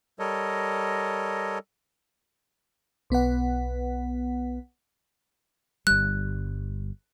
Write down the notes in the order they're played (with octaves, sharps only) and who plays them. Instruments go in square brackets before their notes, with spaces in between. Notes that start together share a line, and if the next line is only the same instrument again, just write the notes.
[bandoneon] G3 A4 A#4 C#5 D#5
[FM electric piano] B1 B3 B4 F#5
[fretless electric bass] G1 G3 [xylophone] F#6